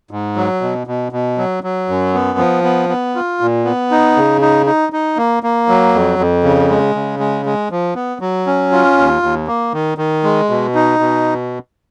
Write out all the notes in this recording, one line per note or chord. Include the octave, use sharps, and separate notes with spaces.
G#2
F#3
B2
B2
B2
F#3
F#3
F#2
B3
F3
B3
B3
F4
A#2
B3
D#4
C#3
D#4
D#4
D#4
A#3
A#3
F#3
F2
F2
C#3
G#3
C#3
G#3
G#3
F3
B3
F#3
C#4
F4
D#2
D#2
A#3
D#3
D#3
G#3
B2
D#4
B2